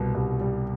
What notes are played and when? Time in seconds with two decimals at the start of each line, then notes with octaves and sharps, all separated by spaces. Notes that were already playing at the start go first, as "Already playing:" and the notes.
Already playing: C2 B2 G3
0.14 C2
0.40 G3